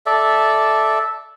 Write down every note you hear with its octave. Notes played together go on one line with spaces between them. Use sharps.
A4 D5 E5